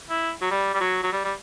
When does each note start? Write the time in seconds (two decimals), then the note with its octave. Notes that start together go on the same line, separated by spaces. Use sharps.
0.09 E4
0.42 F#3
0.51 G3
0.74 G3
0.80 F#3
1.03 F#3
1.12 G3
1.24 G3